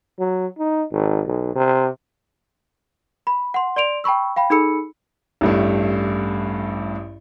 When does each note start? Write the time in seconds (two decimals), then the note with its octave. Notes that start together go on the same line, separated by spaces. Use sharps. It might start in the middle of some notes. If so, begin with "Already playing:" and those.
0.19 F#3
0.58 D#4
0.92 G#1
1.26 B1
1.55 C3
3.27 B5
3.54 F#5 C6
3.76 D5 C6 D7 F7
4.04 G5 A5 B5 C#6 E6
4.36 F5 G5 B5
4.50 D#4 G#4 A4 B5 E6 C#7
5.41 A1 G2 A3